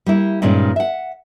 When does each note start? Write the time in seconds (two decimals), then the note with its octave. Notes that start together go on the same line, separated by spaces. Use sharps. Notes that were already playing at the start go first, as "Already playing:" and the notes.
0.06 G3 A#3 E4
0.42 G2 A#2 D#3 G#3 C#4
0.76 E5 F#5